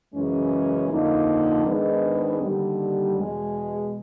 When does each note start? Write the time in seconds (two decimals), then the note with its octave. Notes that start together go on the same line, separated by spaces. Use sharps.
0.14 F#2 C#3 E3 G#3 C#4
0.90 F2 D3 F3 A#3 D#4
1.65 G#2 D#3 G#3 B3 D4
2.41 D#2 D3 G3
3.16 E2 B2 G#3